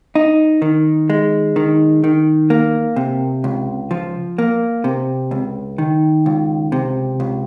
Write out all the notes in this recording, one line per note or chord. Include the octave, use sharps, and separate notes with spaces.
D#4
D#3
G#3
D#3
D#3
A#3
C3
C#2
F3
A#3
C3
C#2
D#3
C#2
C3
C#2